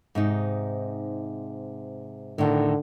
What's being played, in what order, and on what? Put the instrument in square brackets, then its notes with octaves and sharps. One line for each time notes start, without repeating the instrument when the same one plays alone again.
[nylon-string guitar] G#2 C3 D#4
[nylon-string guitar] A2 D#3 [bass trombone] D3